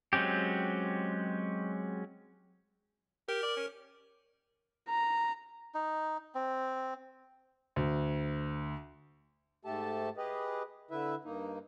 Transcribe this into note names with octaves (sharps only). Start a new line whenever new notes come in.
F#3 G#3 C4 C#4 G4
G4 A#4
D5
C#4
A#5
D#4
C4
D2
G#2 A3 G4 A4 A5
G4 G#4 B4 D#5
D3 E4 B4 E5
G2 A#3 D#4